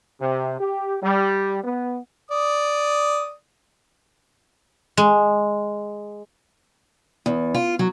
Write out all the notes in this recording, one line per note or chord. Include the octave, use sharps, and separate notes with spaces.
C3
G4
G3
B3
D5 D#6
G#3
E2
F4
F#3